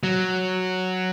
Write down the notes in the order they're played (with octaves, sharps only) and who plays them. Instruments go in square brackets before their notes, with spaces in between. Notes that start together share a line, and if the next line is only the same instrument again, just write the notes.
[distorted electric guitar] F#3